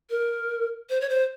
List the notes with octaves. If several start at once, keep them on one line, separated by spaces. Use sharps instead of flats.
A#4
C5
C#5
C5